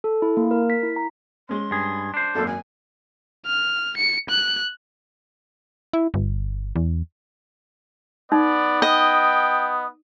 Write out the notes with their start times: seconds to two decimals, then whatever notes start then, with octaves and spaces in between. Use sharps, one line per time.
0.04 A4
0.22 E4
0.37 A#3
0.51 A#4
0.70 B6
0.83 E4
0.96 A#5
1.49 G#3 C#4 C6
1.71 G2 G#4
2.14 D4 C5
2.35 G#1 F#2 A#3 A4
2.47 G#5
3.47 F6
3.97 C#7
4.29 F#6
5.93 E4
6.14 G1
6.76 E2
8.32 B3 D#4 D5
8.82 D#5 G5